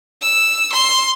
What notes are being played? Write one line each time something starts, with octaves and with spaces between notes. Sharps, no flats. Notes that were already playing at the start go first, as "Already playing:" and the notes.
E6
C6